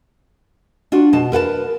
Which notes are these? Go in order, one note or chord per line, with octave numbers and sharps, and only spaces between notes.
D4 F4 F#4
B2 A5
A#4 B4 F#5 A5